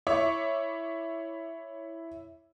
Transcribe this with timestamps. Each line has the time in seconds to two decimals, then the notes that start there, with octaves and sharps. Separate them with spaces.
0.07 E4 C#5 E5 C#6 D6